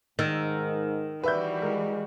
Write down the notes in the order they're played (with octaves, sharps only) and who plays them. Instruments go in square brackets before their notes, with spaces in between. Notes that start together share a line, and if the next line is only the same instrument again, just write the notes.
[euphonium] G#2 [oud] D#3 [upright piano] E6 A6
[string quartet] E3 G3 F#4 [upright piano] B4 E5 G6
[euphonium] G#3 [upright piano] A#4